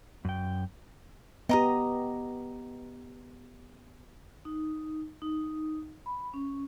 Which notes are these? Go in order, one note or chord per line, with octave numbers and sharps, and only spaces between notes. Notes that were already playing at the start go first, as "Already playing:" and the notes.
F#2 G5
B3 G4 D#5 A#5 D#6
D#4
D#4
B5
C#4